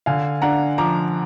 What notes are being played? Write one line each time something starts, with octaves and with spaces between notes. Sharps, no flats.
D3 F5 G#5
D4 F#5 A#5
F3 A#5 D6